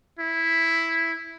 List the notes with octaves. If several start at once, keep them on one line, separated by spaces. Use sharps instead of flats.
E4